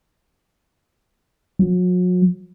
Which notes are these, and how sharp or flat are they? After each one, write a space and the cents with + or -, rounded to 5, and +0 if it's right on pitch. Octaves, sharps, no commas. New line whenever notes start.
F#3 -40